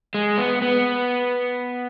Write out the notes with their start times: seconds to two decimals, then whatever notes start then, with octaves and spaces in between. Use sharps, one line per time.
0.14 G#3
0.38 B3
0.62 B3